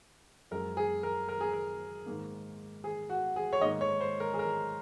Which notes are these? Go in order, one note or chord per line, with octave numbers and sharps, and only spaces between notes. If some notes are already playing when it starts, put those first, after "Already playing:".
F#2 F3 G#3 A#4
G#4
A#4
A#4
G#4
A#4
G#2 D#3 A#3
G#4
F#4
G#4
C#5
G#2 D#3 A#3 D#5
C#5
C5
A#4
G#4
A#4